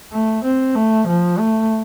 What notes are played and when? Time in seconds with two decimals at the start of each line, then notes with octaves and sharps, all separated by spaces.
0.12 A3
0.44 C4
0.75 A3
1.07 F3
1.39 A3